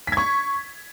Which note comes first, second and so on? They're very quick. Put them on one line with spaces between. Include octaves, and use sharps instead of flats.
B6 G#6 C#6